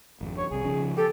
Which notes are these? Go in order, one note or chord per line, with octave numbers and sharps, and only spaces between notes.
G#1 F2
C#5
C2 C3 G#4
C#3 F3 C#4
G4 A4